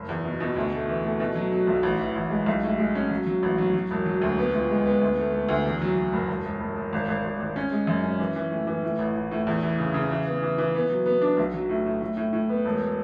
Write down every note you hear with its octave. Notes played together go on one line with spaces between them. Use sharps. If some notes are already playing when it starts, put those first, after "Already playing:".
Already playing: F#1
E2
B2
B2
D2
A3
E3
A3
B2
F#3
F#3
B1
A1
E3
A1
G#3
B1
A2
G#3
C#4
F#3
F#3
A1
F#3
F#3
E1
F#3
D2
B3
C#2
G#3
B3
D2
A3
A3
D2
E2
F#3
F#3
F#1
E1
E1
E1
E1
G#1
G#1
G#1
G#1
C#4
G#3
F#2
C#4
E3
E3
A2
E3
A2
A1
A1
A2
E2
E3
C#3
C#3
E3
B3
E3
E3
B3
F#3
B3
D4
B1
F#3
A2
A2
A2
A2
A2
B3
E1